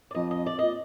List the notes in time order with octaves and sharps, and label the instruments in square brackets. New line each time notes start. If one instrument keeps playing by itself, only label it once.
[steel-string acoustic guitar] D5
[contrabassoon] F2 [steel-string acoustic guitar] D#5
[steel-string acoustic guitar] D#5
D5
[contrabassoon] A#2 [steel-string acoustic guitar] D#5